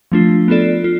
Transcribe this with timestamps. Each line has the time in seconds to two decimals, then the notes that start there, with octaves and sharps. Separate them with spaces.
0.12 F3 A3 D4 F4
0.48 B3 F4 A4 D5
0.84 F4